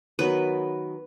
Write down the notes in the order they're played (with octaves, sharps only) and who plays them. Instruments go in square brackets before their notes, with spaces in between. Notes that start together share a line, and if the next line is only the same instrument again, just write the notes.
[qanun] D#3 F#3 B3 B4